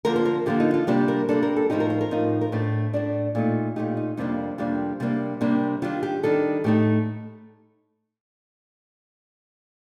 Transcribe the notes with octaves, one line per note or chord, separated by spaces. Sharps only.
D3 F3 A#3 A#4
C5
A#4
D3 F3 A#3 G4
D#4
F4
C3 G3 A#3 D4 G4
A#4
C3 G3 A#3 D4 A4
A#4
A4
A2 F3 C4 D#4 G4
A#4
C5
A#4
A2 F3 C4 D#4
A#4
A2 A3 D4 C5
A2 A3 D4 D5
A#2 A3 D#4
A#2 A3 D#4 G4
D#4
F2 C3 G3 A#3 D4 D#4
F2 C3 G3 A#3 D4
C3 G3 A#3 D4
C3 G3 A#3 D4
D#3 G3 D4 F4
G4
D#3 G3 D4 A4
A2 A3 D#4 G4